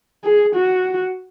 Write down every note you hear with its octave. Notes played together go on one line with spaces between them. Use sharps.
G#4
F#4